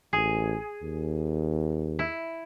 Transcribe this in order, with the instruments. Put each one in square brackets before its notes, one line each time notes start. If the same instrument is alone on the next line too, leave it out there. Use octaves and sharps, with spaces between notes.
[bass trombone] A1 [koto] G#4
[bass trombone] D#2
[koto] E4